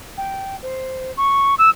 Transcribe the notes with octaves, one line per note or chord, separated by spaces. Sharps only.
G5
C5
C#6
E6